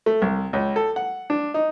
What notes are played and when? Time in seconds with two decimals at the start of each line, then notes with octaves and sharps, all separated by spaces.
0.06 A3
0.22 C2
0.53 C#2
0.76 A4
0.96 F#5
1.30 D4
1.54 D#4